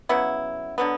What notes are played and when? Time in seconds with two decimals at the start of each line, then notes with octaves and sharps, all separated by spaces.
0.09 C#3 F#3 B3 E4
0.78 D3 F#3 B3